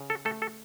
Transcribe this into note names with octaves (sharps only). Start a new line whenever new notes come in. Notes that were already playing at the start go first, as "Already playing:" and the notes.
Already playing: C#3
A4
A3 A4
A4